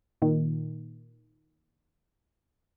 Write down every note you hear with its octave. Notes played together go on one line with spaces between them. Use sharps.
A#2 D#3